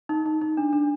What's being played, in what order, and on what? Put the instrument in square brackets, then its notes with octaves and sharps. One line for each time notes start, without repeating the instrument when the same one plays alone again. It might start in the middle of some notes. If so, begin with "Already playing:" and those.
[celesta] D#4
D#4
D#4
D4
D4